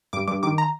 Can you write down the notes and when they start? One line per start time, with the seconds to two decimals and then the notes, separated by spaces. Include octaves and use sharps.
0.13 G2 D6
0.28 G2 D6
0.43 D#3 D6
0.58 A#5